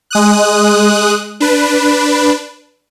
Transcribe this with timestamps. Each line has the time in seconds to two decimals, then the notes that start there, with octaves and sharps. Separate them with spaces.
0.11 G#3 D#6 F#6
1.40 D4 B4